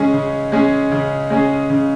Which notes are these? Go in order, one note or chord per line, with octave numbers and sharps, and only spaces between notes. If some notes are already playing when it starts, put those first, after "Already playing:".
Already playing: C#3 G#3 C#4 G#4
C#3
G#3 C#4 G#4
C#3
G#3 C#4 G#4
C#3